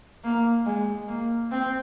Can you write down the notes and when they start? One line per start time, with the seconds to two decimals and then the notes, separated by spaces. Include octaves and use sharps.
0.24 A#3
0.66 G#3
1.08 A#3
1.52 C4